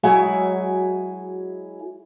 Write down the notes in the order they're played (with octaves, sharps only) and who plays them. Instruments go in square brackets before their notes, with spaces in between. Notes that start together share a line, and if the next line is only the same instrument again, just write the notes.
[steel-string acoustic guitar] F#3 G#3 E4 F#4 G#4